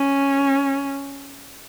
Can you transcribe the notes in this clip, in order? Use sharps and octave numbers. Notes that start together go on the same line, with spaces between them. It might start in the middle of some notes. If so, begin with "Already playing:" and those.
Already playing: C#4